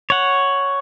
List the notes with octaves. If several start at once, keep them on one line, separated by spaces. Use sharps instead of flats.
C#5 F#5